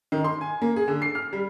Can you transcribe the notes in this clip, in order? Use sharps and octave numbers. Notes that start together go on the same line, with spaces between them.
D#3
C6
G#5
A#3
G#4
D3
C7
F6
G3